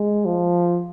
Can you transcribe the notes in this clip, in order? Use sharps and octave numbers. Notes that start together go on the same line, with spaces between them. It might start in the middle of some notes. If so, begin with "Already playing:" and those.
Already playing: G#3
F3